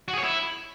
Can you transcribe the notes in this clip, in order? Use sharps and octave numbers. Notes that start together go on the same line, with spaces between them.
F#4
G#4
C#5
E4